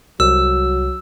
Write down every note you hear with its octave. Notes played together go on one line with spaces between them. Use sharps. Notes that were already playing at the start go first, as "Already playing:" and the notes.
C2 F#3 E6